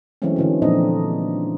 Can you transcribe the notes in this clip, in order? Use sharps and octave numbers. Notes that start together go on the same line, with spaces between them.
E3 F#3 G#3 A3 C4 C#4
D3 E3 C#4
A#2 F3 C4 D4 D#4 D#5